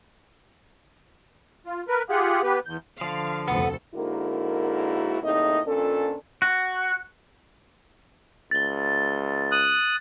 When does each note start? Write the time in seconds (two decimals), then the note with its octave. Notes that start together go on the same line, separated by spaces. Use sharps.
1.66 F4
1.88 A#4 B4
2.10 F4 G4 G#4 F#5
2.43 B3 G4 B4
2.66 E2 G6
3.01 D3 F3 F5
3.48 F1 D2 B3 A4
3.95 G#2 D3 A#3 E4 F#4 A#4
5.22 E2 A2 C3 A#3 D#4 D#5
5.66 F2 A#2 C#4 D4 A4
6.42 F#4
8.51 C#2 A6 G7
9.52 D#6 F#6